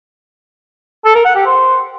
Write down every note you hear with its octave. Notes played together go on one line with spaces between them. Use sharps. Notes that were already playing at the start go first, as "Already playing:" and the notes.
A4
A#4
F#5
G4
C5